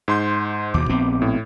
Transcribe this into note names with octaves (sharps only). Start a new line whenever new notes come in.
G#2 C6 G6
D#2 B2 D6
A#1 B3 C4
A2